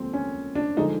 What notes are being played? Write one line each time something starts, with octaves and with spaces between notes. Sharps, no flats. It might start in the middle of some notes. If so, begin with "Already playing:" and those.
Already playing: D#2 D3 F3 G#3 C4
C#4
D4
D3 F3 G#3 D#4